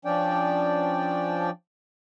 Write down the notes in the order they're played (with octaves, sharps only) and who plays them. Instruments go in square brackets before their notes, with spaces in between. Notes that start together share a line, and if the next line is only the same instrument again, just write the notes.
[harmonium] F3 C#4 D4 D5 G5